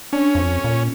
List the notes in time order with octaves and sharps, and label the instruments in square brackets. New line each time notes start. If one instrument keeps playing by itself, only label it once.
[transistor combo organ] C#4 [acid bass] D4
[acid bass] F2
A#2